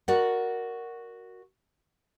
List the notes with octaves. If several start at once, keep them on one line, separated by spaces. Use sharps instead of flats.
F#4 A#4 D5 F#5